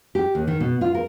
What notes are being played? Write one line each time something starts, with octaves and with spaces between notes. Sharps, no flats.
G4
D#2
D#3
B2
F4
A#4